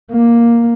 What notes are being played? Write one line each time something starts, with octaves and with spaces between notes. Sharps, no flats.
A#3